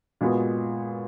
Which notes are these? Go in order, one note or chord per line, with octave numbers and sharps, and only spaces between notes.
A#2 G#3 B3 F#4